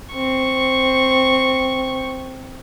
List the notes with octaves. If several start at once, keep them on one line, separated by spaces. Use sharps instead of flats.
C4 C#6